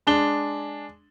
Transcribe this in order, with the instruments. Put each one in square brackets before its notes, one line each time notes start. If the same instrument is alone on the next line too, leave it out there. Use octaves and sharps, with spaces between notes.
[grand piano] G#3 D4 G7